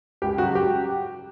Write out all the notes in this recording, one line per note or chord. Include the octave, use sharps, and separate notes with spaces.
C#2 G4
C#3 F#3 F#4
G4